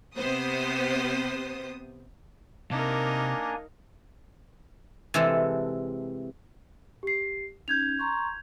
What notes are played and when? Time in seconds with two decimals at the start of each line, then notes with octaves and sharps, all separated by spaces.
0.16 C3 B3 C5 D#6
2.71 C3 A#3 D4 D#4 A#4 G#5
5.14 C3 E3 G#3 A4
7.03 G4 C7
7.68 C#4 D#4 G6 G#6 F7
7.99 A#5 C6 C#6